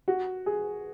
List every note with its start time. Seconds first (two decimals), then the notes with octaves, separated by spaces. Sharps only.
0.08 F#4
0.46 G#4